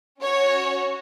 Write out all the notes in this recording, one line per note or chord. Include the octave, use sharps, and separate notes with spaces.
C#4 F#4 C#5